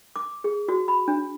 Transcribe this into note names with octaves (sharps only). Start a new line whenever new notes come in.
D6
G#4
F#4
B5
D4